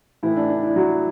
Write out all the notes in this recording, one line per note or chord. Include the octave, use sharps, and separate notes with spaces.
A2 E3 E4
D4
D4
E4
F#3 F#4